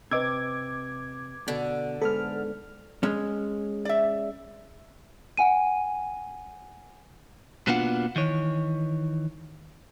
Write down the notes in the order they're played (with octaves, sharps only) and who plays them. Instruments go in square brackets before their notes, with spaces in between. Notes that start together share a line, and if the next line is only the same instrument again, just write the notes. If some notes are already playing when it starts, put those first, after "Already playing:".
[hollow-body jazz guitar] C3 [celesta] B4 D#5 E6 [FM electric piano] D6 G#6
[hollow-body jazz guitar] B2 [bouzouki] D3
[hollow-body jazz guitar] G#2 B3 [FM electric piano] A4 F6
[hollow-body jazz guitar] G#3 C#4
[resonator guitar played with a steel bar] D5 E5
[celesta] F#5 G#5 D#7
[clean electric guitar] B2 A#3 B3 D4 F4 F#5
D#3 E3 C#5